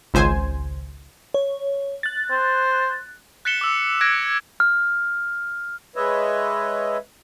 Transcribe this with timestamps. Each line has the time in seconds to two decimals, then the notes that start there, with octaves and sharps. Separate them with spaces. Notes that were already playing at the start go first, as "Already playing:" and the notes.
0.14 G#1 C#2 C5 G#5
1.34 C#5
2.03 F#6 A6
2.31 C5
3.45 F#6 A6 B6 C#7 E7 G7
3.61 D6 E6
4.01 F#6 G#6 A#6 D7
4.60 F6
5.96 G#3 B4 C#5 D#5 E5